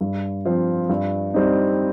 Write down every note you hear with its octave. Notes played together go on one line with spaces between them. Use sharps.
G2
F3 C4 F4
G2
G3 C4 D#4